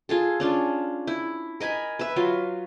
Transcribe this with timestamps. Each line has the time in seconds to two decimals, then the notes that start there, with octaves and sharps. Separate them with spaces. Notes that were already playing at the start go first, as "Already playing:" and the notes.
0.09 F4 G#4 A4
0.40 C#4 D4 F4
1.07 E4
1.60 A#4 D#5 G#5 B5
1.99 B4 E5
2.16 F#3 F4